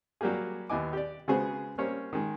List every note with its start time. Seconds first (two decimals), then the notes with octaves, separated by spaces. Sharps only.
0.21 F#3 G3 A#3 G4 G#4
0.69 D#2 B3 E4 D#5 G#5 D6
0.93 G4 D5
1.28 C#3 G#3 B3 F#4 G#4 C5
1.78 G3 A#3 C4 C#4 C#5
2.13 D#3 G#3